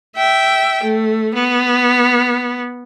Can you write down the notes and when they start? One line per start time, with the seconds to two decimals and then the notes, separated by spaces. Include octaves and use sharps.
0.16 E5 G5
0.83 A3
1.34 B3